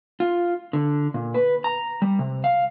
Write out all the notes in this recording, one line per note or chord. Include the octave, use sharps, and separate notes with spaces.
F4
D3
A#2
B4
A#5
G3
C3
F5